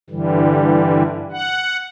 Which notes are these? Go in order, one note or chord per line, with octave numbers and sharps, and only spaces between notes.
G2 D3 E3 G3
F#5